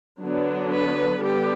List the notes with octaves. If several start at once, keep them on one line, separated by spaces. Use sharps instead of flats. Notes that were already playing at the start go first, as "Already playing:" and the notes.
D3 F#3 B3 D4
B4
D3 G3 B3 G4